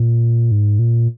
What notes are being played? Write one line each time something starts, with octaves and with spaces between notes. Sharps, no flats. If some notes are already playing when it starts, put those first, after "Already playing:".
Already playing: A#2
G#2
A#2